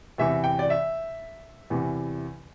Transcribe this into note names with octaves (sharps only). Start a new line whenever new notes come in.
E2 C3 E3 E5
G5
D5
E5
E2 C3 E3